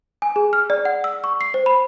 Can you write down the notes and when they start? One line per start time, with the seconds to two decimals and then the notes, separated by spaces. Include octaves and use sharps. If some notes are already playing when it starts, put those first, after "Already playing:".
0.22 G#5
0.36 G#4
0.53 F6
0.70 D5
0.85 F#5
1.04 E6
1.24 C#6
1.41 C7
1.54 C5
1.66 B5